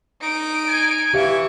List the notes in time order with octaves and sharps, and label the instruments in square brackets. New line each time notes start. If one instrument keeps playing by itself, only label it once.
[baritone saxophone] D#4 [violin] D7
[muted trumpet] G#5
[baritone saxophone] E3 [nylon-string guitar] G4 E5 F5 [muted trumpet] C#6